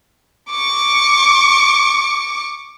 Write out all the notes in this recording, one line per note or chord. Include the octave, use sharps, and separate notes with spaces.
C#6 D6